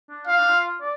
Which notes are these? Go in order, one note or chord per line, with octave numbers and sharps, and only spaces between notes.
D4
F4 F5
D4
F4
D5